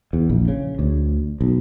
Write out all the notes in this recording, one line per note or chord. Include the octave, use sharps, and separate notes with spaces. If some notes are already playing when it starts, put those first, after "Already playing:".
E2
A#1
C#3
D2
B1